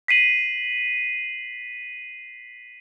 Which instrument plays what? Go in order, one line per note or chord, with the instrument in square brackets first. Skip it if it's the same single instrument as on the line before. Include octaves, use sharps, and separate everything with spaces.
[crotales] B6 C7 D#7 F#7